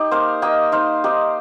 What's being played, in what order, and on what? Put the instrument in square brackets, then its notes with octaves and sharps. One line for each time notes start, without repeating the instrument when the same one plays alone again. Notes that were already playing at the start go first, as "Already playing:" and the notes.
Already playing: [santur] D#4 G4
A#3 C5 F5
A#3 D#5 G5
D#4 C5 F5
D#4 G4 C5